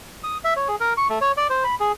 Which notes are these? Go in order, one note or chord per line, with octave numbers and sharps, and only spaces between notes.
D#6
E5
C#5
G#4
A#4
C#6
A3
C#5
D5
C5
B5
G#4